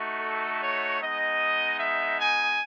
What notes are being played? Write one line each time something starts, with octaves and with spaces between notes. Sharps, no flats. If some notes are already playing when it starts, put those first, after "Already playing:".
Already playing: A3 D#4 F#4
A4
C#5
G#3 B3 D#4 D#5
E5
G#5